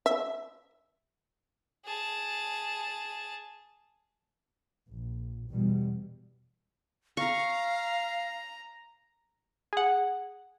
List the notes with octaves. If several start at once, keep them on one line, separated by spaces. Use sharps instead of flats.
E5
G#4 A5
A#1
E2 B2 G3
F5 A#5 C#6
G#4 F#5